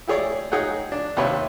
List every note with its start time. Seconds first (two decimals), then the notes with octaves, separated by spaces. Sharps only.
0.07 E4 G4 G#4 C#5 D5
0.51 D#4 G#4 C#5 F#5 G5
0.92 D4
1.17 D#2 C3 G4 B4 C#5